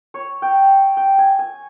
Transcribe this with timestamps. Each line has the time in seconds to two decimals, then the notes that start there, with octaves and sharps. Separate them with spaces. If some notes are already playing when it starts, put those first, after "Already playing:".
0.14 C#5
0.42 G5
0.97 G5
1.18 G#5
1.39 G#5